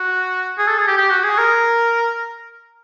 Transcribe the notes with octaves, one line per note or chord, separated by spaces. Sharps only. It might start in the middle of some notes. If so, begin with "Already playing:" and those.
Already playing: F#4
G#4
A4
G#4
G4
G4
F#4
G#4
A#4